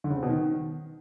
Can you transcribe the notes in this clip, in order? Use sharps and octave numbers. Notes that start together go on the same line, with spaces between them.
D3
C#3
C4
B2
D#3